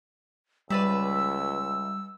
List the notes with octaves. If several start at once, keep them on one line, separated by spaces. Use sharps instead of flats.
C#2 G3 B4 D5 E5 E6